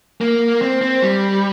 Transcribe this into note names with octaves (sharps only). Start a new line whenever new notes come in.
A#3
C4
C4
G3